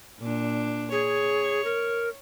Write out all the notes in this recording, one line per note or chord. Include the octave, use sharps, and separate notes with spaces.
A#2 D4
G#4 C#5
A#4